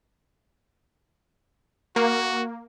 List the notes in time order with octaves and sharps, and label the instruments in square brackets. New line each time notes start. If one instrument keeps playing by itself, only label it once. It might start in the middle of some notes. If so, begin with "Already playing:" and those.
[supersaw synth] A#3 [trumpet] F#4